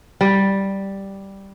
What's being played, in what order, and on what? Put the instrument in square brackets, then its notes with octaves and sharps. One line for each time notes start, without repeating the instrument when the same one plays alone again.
[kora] G3